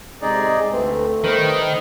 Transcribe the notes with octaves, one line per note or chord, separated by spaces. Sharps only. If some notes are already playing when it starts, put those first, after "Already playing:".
A2 C3 G#3 D#4 G#4 D5
D2 A3 C4 B4
D#3 G3 B4 C5